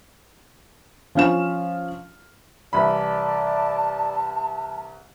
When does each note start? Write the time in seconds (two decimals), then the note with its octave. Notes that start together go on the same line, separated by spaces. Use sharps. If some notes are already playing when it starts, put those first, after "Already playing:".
1.15 F3 C#4 F5 E7
2.73 C2 E3 D5 A5 B5